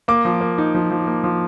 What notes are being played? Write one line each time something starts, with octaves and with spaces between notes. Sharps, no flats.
A#3 D6
F3
A#3
D#4
F3
F3
A#3
F3